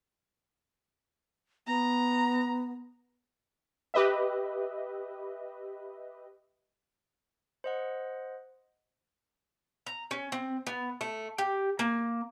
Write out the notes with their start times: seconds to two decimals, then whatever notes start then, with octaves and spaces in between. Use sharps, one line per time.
1.67 B3 A#5
3.94 G4 B4 D#5 E5
7.64 C5 D#5 F#5
9.87 A#5
10.11 C#4
10.32 C4
10.67 B3
11.01 A3
11.38 G4
11.79 A#3